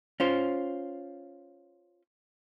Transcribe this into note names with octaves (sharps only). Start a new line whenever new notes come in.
C#4 F4 C5